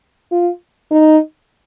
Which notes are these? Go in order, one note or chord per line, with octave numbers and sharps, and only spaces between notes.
F4
D#4